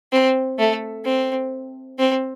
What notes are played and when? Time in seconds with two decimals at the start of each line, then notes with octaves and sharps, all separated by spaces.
0.12 C4
0.59 A3
1.05 C4
1.99 C4